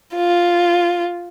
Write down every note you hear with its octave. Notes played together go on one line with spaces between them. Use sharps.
F4